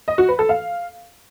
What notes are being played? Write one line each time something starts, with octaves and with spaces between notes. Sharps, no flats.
D#5
F#4
B4
A4
F5